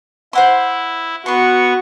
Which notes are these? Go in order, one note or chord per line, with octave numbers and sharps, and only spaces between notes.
E4 C5 F#5 C6
B3 F#4 B4 C6 C#6